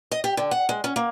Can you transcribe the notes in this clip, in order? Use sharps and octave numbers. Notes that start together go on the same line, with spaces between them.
D#5
G4
D3
F#5
G#3
C#4
A#3